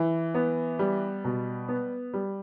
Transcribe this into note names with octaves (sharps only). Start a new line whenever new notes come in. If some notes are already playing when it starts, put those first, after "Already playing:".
Already playing: E3
B3
G3
B2
B3
G3